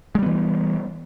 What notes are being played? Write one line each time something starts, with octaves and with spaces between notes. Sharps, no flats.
E3 G3 G#3 B3